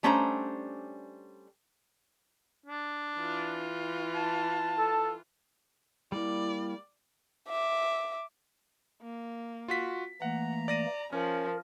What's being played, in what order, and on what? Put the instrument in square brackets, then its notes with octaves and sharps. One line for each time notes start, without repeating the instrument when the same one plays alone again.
[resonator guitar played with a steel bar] G3 A3 C#4 D4 C5 A#5
[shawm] D4
[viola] E3 F4
[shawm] A5
[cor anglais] A4
[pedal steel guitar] G3 A#3 [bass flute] E4 [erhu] D5
[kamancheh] E5 D6
[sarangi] A#3
[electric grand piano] F4 F#4 B6
[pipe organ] E3 A3 A#3 [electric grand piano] F#5 [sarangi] A#5
[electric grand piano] D5 A#6 D#7
[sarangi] F3 [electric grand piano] C#4 [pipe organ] A#4